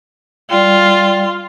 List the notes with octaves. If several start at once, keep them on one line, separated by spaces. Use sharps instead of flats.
G3 F4 D5 G5